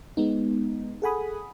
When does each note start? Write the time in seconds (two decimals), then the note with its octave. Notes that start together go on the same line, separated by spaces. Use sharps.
0.17 G#3 B3 D#4
1.02 G#4 A4 F#5 G#5 B5 D#6